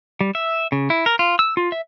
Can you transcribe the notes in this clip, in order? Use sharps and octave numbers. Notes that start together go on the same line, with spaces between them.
G3
E5
C#3
E4
A#4
F4
E6
F4
E5